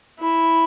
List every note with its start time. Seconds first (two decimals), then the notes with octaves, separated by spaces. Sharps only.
0.19 E4